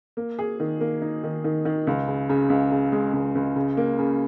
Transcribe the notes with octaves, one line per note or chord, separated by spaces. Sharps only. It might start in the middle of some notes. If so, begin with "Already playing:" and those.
A#3
G#4
D#3
A#3
D#4
D#3
D#3
D#3
C#2
C#3
C#3
C#2
C#3
G#3
C#2
C#2
C#3
A#3
C#3